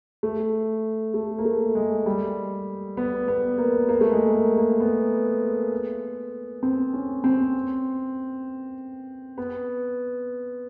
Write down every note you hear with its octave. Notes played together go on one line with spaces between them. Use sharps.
A3
A3
A#3
A3
G#3
G3
B3
B3
A#3
A#3
A3
G#3
A#3
A#3
B3
C4
C#4
C4
B3